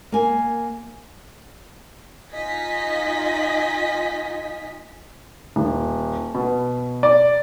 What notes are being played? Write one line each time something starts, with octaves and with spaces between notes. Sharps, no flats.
A#3 G#5
D#4 F4 D#5 G#5 B6
D#1
B2
D5